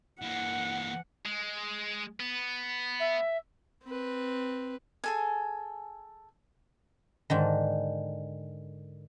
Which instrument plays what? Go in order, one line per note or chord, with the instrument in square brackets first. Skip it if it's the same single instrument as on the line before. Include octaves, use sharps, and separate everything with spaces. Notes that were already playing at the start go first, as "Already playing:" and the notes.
[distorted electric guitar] E3 A#3 [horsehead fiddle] F#5
[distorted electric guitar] G#3
B3
[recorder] E5
[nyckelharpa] C4 B4
[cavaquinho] G#4 A4 G#5
[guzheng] G#2 D3 D#3